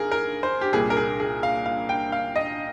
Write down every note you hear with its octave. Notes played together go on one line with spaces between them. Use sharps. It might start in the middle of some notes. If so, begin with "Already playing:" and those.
Already playing: G#1 D#3 G#4 A#4
A#4
C5
G4
C2 A#2 G3 A#3 G#4
A#4
G#4
G#4
F5
F5
G5
F5
D#5